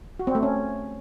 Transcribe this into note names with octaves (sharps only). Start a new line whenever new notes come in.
F#4
C4
A3
C#4